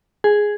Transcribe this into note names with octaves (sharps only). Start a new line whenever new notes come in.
G#4